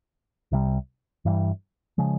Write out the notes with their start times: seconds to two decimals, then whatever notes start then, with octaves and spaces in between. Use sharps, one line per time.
0.52 C2 C3 G3
1.25 G2 E3 G3
1.98 C#3 F3 G#3